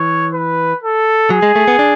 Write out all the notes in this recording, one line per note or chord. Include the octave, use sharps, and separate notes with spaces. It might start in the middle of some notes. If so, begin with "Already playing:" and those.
Already playing: E3 C#5
B4
A4
F#3 G#4
G#3
A3
B3
D4